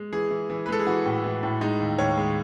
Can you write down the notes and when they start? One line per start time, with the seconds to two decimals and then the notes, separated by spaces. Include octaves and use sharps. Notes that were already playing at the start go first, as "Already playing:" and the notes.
Already playing: G#3
0.12 E3 G#4
0.30 E3
0.50 E3
0.66 B4
0.68 G#3 A4
0.80 G#4
0.87 E3 F#4
1.05 A2
1.24 E3
1.43 A2
1.61 G#3 D#4
1.80 D#2
1.99 D#2 C#5
2.17 G#3